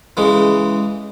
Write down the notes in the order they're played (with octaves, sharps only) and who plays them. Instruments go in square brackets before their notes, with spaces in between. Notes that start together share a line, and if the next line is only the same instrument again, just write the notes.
[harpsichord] C#3 E3 G#3